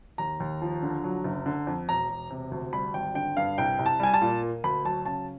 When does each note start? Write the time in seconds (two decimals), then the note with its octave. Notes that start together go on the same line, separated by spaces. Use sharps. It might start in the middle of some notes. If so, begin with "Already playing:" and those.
0.18 D#2 A#5
0.40 D#2
0.62 F3
0.82 D3
1.04 F#3
1.24 F#1
1.46 D3
1.67 F2
1.89 E1 A#5
2.09 E1
2.30 C3
2.51 D2
2.73 G3 B5
2.94 G#1 G5
3.15 D3 G5
3.37 G2 F5
3.58 C2 G5
3.79 C2
3.86 A5
4.00 G3 G#5
4.14 A5
4.21 A#2
4.43 A#3
4.64 D2 B5
4.84 F#3 A5
5.06 C#3 A5